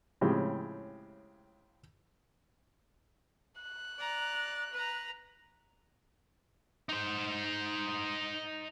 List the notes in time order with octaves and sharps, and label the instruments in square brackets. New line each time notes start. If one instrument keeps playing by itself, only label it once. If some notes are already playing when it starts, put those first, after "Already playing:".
[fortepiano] A2 C#3 F3 G#3 C4 G4
[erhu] F#6
[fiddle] D5 A#5
B4 A#5
[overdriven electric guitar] D#4 C5